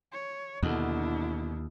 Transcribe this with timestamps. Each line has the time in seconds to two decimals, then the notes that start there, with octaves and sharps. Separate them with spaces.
0.12 C#5
0.63 D#2 B2 D3 D4 E4